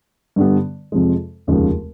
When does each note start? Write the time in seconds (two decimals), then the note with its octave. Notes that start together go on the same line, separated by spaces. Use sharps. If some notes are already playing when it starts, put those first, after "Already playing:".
0.36 G2 D3 G3 B3
0.92 F2 C3 F3 G#3
1.47 F1 D#2 C#3 F3 G#3